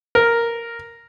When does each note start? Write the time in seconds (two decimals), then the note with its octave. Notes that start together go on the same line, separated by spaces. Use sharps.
0.15 A#4